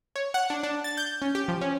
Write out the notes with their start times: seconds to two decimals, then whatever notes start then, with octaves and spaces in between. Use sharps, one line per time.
0.16 C#5
0.34 F#5
0.50 D4
0.63 D4
0.84 A6
0.97 G6
1.22 C#4
1.35 G4
1.48 F3
1.61 C#4